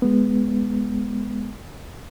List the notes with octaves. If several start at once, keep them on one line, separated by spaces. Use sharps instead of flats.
G#3 B3